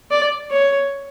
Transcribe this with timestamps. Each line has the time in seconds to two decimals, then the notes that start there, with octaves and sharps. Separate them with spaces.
0.11 D5
0.51 C#5